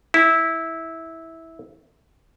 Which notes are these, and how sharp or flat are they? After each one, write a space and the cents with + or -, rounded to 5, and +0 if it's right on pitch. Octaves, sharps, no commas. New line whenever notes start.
E4 -15